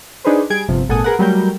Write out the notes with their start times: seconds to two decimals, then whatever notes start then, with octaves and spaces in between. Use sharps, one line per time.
0.25 D4 D#4 G#4 B4 C5
0.50 G3 G#4 G#6 D7
0.69 G1 C3 F3
0.89 G#1 A#2 A4 F#5 G#5 D#6
1.04 G#4 A#4 B4 F#5
1.19 F#3 G3 A3 A#4 G6